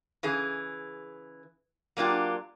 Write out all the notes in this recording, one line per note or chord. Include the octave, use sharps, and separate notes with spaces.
C#3 E3 G#4
F#3 A#3 D4 F4 G4